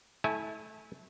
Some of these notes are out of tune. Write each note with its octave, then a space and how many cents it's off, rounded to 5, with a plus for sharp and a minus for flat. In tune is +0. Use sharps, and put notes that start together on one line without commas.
A3 -15 E4 -25 G#5 +0